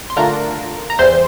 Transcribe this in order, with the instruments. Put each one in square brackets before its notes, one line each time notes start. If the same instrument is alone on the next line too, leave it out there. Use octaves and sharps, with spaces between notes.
[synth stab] C6
D3 A3 D4 F4 A#4 A#5
A#5
E2 E3 G3 C5 C6